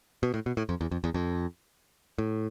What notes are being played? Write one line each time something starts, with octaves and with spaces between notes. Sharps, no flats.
B2
A2
B2
A2
F2
E2
F2
E2
F2
A2